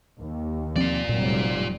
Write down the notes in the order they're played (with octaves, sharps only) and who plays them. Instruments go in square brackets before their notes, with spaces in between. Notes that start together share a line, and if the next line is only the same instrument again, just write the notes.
[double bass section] D#2
[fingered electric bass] F3 C4 [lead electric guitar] F4 D5
[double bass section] F1 F#3 G3 [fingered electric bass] A#2